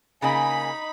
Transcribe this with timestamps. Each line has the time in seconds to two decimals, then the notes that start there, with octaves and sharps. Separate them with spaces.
0.22 C#3 A#3 D#4 G#5 B5